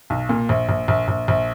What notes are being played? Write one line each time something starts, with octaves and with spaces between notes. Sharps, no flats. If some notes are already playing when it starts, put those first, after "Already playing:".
B1
A#2
A#1
A#1
A#1
A#1
A#1